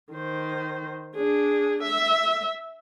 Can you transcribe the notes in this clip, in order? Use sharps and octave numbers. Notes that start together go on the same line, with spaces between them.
D#3 C5
D4 G#4
E5